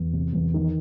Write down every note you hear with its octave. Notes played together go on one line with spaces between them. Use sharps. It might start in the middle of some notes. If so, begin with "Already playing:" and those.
Already playing: E2
C3
E2
D#3